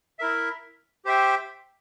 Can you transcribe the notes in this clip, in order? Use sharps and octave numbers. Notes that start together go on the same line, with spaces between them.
E4 A#4 E5
G4 C5 E5 G5